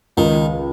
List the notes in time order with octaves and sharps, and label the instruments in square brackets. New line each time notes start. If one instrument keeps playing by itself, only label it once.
[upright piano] C#2 [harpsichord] D#3